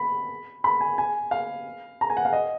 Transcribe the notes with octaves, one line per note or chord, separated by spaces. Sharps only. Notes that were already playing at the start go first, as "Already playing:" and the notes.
Already playing: B5
B5
G#5
G#5
F5
A#5
G#5
F#5
F5
D#5